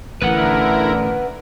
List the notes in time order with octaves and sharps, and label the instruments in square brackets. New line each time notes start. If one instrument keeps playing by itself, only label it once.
[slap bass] A1 [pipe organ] D3 E4 A#4 [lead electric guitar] B4 F#5